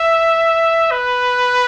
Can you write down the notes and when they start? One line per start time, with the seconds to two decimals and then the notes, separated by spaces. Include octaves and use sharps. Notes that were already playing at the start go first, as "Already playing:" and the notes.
Already playing: E5
0.91 B4